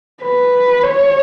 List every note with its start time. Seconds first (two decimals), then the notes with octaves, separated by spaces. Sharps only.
0.23 B4
0.84 C#5